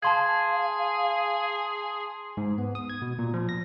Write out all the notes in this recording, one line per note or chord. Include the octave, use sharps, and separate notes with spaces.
G#4 F5 A5 C6 G#6
G#2
B3
D#6
G#6
B2
A#2
F3
A#6